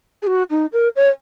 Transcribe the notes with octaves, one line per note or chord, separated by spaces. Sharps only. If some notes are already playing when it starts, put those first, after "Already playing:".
G#4
F#4
D#4
A#4
C#5